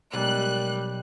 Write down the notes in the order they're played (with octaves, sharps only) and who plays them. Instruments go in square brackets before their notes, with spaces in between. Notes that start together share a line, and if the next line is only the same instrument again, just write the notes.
[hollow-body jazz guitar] B1 [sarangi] G3 [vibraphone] G#3 A#4 D#5 [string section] F#6